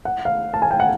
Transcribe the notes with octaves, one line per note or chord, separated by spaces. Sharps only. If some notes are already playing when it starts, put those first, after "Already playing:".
F#5
F5
A5
G#5
G5
F#5